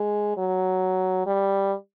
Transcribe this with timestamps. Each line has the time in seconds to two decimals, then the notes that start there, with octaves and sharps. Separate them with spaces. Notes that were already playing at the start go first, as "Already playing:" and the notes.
Already playing: G#3
0.37 F#3
1.26 G3